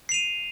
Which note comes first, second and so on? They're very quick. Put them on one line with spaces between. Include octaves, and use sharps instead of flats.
C7 F7 D#7